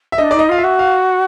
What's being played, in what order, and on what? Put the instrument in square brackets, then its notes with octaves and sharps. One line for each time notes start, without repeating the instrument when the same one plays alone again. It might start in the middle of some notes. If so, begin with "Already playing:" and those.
[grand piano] E5
[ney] D4 [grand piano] D#5
[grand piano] D5
[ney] D#4
[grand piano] D#5
[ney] F4 [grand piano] F5
[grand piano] E5
[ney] F#4
[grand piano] F5